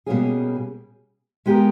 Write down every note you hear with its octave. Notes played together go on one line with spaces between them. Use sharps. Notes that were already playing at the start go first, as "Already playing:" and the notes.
B2 G3 A#3 C#4 G#4
G#3 B3 G4 A#4